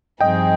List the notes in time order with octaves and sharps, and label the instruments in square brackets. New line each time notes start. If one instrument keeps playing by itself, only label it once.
[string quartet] G2 F3 C4 D#4 G#4 [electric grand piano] D#5 G5